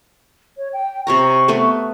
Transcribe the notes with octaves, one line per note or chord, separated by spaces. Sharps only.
C#5
G5
C3 C#5 A#5 C#6
A3 B3 B4